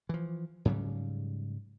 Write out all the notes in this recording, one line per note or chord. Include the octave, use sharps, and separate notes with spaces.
E3 F3
G#2 C#3 F#3 G3